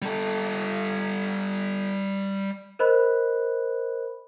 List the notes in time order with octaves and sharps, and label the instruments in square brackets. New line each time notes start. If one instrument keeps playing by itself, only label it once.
[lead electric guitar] G3 A4
[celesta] A#4 C5 D#5 B5 F#6